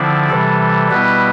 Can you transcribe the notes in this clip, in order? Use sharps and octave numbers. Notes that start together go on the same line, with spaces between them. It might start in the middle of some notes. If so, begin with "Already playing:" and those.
Already playing: D3 F3 C4 E4 D5
C3 E3 G3 A4
B2 G3 B3 E4 B4